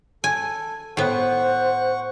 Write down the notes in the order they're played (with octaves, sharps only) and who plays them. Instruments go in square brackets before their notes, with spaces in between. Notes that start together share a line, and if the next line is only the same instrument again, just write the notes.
[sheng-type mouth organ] A4 [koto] G#5
[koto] A2 B3 [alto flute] C5 [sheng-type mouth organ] F#5 C#6